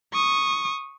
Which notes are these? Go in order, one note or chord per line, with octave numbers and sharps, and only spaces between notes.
C#6 D#6